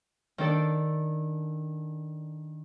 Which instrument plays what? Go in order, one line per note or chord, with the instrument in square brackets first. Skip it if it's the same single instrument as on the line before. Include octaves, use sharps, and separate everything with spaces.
[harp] D#3 D4 A4 D5